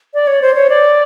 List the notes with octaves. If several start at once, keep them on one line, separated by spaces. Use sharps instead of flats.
D5
C#5
C5
C#5
D5